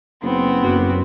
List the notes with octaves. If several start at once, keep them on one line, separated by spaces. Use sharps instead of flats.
F#1 B3 C4
F#2 A#3 F#4